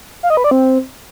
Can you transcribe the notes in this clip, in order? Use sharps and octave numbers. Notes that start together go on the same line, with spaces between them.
F5
D#5
B4
D5
C4